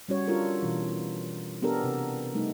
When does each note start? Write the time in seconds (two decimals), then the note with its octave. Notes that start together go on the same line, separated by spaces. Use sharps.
0.08 G3 C#4 F#4 C#5
0.28 D4 F4 G4 A4 A#4
0.62 B2 E3
1.62 B3 D4 G4 A4 A#4
1.84 C3
2.34 G3 A3 D#4